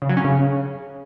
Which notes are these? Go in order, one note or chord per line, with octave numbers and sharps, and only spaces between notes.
C#3
F#3
C#4
C#3